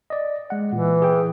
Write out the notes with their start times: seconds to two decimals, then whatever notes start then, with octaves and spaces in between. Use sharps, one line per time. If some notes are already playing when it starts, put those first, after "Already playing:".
0.10 D5 D#5
0.50 G#3 F#5
0.73 A#2 E3
1.02 G#4 G5